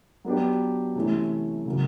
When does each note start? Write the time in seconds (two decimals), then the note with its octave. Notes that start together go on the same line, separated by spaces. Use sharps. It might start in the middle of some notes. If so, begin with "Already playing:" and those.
0.25 F#3 B3 D4 G4
0.95 C3 E3 A3 C#4
1.66 C#3 F#3 A#3